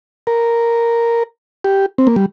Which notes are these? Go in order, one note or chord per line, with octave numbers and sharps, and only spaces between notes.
A#4
G4
C4
A#3
G3